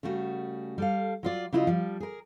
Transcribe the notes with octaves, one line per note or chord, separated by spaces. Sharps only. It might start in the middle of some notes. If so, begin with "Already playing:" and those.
C#3 G3 A3 F#4
G3 A4 F5
F#3 F4 D5
C#3 F#3 E4 F4 D5 D#5
F3 G3
G#4 A#4